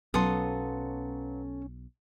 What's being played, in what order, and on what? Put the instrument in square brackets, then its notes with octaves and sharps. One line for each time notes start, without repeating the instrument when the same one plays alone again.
[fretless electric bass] B1 [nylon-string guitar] F#3 B3 F5 [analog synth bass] C#4 [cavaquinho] A4 C6 D#6